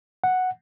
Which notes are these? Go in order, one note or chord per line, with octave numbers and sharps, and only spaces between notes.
F#5